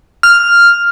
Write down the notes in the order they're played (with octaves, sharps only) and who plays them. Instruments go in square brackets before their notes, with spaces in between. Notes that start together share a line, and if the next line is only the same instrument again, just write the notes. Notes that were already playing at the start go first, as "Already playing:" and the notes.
[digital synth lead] F6